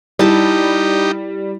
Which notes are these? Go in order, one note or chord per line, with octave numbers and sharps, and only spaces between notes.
G3 D#4 E4 G4 A5